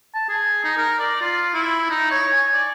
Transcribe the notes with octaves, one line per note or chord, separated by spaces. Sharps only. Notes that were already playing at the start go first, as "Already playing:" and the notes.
A5
G#4
D#4
A#4
D5
F4
E4
D#4
C#5
G#5
D5